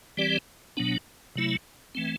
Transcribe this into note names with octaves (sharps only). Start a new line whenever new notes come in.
E3 G3 C4 G4 D5
B2 F#3 B3 D4
C3 F#3 A3 E4
E3 A3 C4